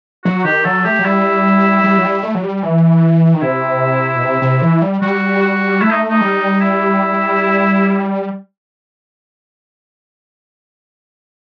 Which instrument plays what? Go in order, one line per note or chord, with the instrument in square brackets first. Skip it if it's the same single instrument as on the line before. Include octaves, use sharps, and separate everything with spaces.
[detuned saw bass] F#3 [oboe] F#4
[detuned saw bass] D#3 [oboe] G4
[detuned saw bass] F#3 [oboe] A4
[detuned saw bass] A3 [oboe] G4
[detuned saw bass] F#3
[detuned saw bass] G3 [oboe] E4
[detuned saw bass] G3
F#3
G3
A3
F#3
G3
E3
D#3
[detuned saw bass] C3 [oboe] E4
[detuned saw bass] B2
C3
C3
E3
G3
[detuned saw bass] G3 [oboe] F#4
[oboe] F#4
[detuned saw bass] A3 [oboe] E4
[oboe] D#4
D#4
[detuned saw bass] G3
[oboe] E4